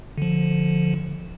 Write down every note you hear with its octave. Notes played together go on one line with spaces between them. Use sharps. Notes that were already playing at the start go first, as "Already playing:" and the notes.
D3 F3